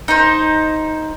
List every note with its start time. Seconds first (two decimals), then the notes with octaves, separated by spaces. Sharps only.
0.08 D#4 C5